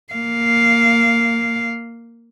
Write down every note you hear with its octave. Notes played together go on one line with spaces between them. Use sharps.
A#3 F5